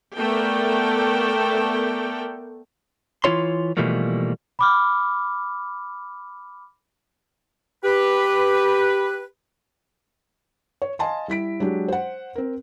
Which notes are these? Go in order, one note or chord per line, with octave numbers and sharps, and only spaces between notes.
A3 B3 A4 A#4 D5 G5
E3 C#4 E4 F4 C#5 C6
B2 E3 F3 G3 A3 A#3
B5 D6 F6
G4 B4
C#5
D#5 F5 G#5 A5 C6
G3 E4 B6 D7
F#3 G#3 D4 G4
C5 F#5
C4 A#4